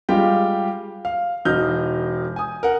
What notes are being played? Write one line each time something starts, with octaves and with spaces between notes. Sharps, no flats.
G3 G#3 F4 G4 G5
F5
E1 D#4 F6 G6
G#5 D#6
A#4 F#5